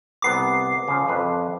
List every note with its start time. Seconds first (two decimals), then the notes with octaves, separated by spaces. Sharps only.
0.22 C2 B3 A#5 D6 C7
0.88 C#3 F3
1.08 F2 B4